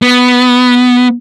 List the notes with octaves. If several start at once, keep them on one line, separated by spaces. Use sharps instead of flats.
B3